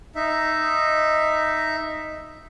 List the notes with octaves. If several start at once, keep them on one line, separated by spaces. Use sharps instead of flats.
D#4 E5